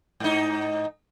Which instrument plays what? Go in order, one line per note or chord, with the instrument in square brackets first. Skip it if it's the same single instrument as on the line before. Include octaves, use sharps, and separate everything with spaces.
[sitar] G#2 D#4